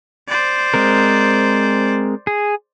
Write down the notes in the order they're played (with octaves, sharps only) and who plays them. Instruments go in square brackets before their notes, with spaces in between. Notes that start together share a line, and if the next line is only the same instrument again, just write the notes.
[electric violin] C5 D5
[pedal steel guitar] G#3 C4 A#4
G#4